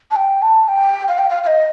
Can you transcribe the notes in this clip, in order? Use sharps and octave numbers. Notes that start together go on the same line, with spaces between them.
A5
G5
A5
G5
F5
G5
F5
F5
D#5